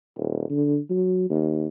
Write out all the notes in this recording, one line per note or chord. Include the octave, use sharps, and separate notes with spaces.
D#1
D3
F#3
D#2